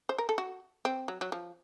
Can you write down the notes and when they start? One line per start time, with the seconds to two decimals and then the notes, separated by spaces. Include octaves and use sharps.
0.09 C5
0.18 A#4
0.29 A4
0.38 F#4
0.85 C4
1.08 F#3
1.21 F#3
1.32 F3